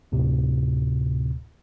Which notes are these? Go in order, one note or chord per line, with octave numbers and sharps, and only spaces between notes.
D2 A2 C3